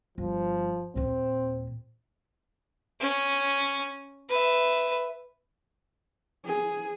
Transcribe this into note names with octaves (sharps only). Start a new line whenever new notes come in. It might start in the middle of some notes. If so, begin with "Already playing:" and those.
G1 F3
D#2 A#2 C4
C#4
B4 E5
G#4